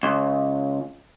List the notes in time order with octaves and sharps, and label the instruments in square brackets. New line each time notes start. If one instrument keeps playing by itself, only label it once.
[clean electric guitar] C#2